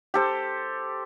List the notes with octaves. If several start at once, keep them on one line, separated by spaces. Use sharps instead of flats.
G4 A4 C5